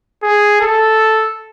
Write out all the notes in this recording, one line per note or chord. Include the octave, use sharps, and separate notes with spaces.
G#4
A4